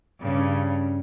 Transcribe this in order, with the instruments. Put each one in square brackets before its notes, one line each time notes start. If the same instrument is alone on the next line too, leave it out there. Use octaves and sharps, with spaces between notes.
[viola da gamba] G2 C#3 C#4